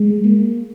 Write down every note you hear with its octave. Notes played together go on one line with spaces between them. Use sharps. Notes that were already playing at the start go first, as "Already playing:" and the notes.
Already playing: G#3
A#3